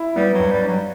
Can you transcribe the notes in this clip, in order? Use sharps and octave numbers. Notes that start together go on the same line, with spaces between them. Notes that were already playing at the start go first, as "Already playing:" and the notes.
Already playing: E4
G3 B3
F#3
G2
G3
D4
F#3